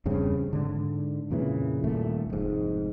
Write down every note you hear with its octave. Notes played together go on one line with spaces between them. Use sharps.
E2 G2 C#3 C4
G#2 D3
F2 A#2 C#3 E3
D#1 A#2 A3
F1 G#2